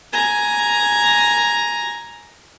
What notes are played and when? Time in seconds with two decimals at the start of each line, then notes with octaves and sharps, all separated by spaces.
0.13 G#5 A#5